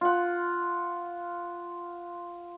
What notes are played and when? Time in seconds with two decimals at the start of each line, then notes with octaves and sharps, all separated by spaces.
0.01 F4 F#5